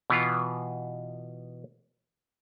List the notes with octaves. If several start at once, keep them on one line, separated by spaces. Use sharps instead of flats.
B2 E3 B3 F4